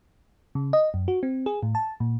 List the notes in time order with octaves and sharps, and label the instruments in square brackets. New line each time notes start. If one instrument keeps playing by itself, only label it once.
[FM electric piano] C#3
D#5
F#2
F#4
C4
G#4
A2
A5
A#2